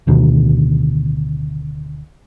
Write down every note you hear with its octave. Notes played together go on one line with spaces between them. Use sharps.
D1 D2 B2 D#3